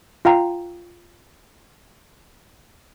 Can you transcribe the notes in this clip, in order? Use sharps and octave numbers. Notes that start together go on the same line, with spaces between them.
F4 F5 G5 A#5